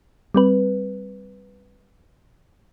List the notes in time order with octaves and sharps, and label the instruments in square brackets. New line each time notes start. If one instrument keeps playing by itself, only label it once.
[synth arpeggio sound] G3 C4 B4